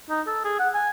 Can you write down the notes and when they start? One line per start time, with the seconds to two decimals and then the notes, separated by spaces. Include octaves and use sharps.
0.10 D#4
0.27 A4
0.44 G#4
0.59 F#5
0.74 G#5